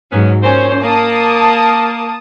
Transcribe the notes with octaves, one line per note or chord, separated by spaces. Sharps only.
G#2 F#3 B3 C#4
A#2 C#4 C5
A#3 A5 D#6